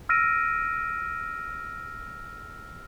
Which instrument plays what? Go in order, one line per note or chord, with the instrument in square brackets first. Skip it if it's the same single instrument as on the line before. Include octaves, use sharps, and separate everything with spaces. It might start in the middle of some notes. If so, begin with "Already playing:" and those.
[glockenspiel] E6 F6 A#6 D7 D#7